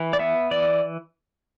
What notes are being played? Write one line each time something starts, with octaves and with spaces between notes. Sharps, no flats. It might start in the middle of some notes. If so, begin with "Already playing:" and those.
Already playing: E3
D5
B3 E5
E3 D5